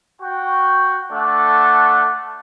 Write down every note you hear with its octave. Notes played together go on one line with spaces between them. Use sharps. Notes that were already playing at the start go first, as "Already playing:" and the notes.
F#4 G5 C#6
A3 D4 A4 F#5